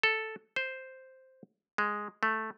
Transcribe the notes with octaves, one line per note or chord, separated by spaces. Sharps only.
A4
C5
G#3
A3